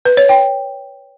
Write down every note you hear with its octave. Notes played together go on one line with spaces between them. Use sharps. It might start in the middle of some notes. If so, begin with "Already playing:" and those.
B4
C#5
G5